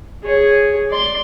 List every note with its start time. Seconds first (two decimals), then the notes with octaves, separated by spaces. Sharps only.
0.23 G#4 C#5
0.90 D5 C6